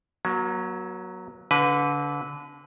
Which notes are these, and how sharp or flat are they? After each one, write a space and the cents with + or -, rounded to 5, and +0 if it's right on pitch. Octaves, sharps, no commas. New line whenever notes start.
F#3 +0 A#3 +45
D3 -30 B4 +0